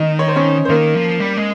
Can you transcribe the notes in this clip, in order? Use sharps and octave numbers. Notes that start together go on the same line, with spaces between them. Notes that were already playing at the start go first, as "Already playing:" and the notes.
Already playing: D#3 D#4 D#5
C#5
C5
C#4 C#5
C5
D#3 A#3 A#4
F3
G3
G#3